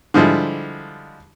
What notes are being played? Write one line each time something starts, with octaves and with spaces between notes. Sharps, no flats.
D3 F3 G3 G#3 E4